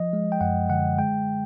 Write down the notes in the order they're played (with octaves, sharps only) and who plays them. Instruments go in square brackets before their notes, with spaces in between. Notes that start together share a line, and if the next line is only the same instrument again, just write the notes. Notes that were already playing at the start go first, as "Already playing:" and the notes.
Already playing: [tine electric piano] F3 D#5
G#3
G5
F#2 F#5
D3 F#5
G#3 G5